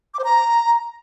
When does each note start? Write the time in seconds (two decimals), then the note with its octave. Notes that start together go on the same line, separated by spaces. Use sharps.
0.14 D6
0.19 C5
0.24 A#5